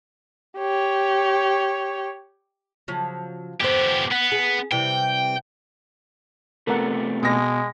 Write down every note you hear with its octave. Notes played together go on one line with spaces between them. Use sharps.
G4 C#5
C#3 F3 F#3
F2 B3 G4 C5
B3
G#4
C3 E3 G3 G5
C3 A3 B3 A4 A#4 F#5
B2 G#3 A#6